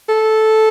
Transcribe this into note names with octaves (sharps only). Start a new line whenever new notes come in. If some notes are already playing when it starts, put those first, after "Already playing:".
A4